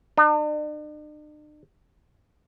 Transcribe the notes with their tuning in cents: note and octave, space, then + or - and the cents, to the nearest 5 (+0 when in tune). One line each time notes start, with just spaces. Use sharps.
D4 +45